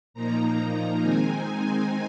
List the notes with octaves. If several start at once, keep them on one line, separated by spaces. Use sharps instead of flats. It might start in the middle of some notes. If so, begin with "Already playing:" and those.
A#2 F3 A#3 D#4 A#5
D#3 G#3 C4 D#4 G#5